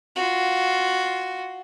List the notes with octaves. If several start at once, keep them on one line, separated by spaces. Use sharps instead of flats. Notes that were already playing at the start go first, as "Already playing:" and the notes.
F4 F#4